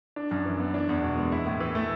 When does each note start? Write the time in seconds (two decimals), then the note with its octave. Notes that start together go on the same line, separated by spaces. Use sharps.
0.16 D4
0.31 F#2
0.45 E3
0.59 B3
0.74 D4
0.89 E2
1.03 B2
1.18 G#3
1.32 E4
1.46 A2
1.60 E3
1.75 A3